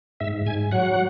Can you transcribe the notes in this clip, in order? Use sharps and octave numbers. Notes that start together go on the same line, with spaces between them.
G#2 E5
G#2 G#5
F#3 F#5